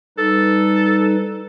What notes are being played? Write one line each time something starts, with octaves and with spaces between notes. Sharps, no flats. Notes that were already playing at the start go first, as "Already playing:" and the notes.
G3 D#4 A4 B4